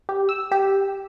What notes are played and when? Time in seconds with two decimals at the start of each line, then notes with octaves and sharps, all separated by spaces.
0.09 G4
0.29 E6
0.52 G4